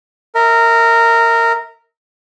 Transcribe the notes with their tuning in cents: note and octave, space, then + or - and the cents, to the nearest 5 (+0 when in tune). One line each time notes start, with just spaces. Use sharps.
A#4 -15 E5 -35